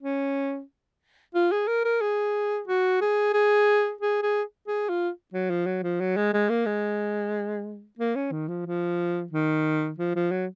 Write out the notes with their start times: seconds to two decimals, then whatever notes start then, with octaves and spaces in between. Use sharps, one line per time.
0.02 C#4
1.35 F4
1.52 G#4
1.68 A#4
1.85 A#4
2.01 G#4
2.68 F#4
3.01 G#4
3.33 G#4
4.01 G#4
4.22 G#4
4.68 G#4
4.89 F4
5.34 F#3
5.50 F3
5.66 F#3
5.83 F3
6.00 F#3
6.17 G#3
6.34 G#3
6.50 A#3
6.66 G#3
7.99 A#3
8.16 C#4
8.32 D#3
8.49 F3
8.66 F3
9.33 D#3
9.98 F3
10.16 F3
10.31 F#3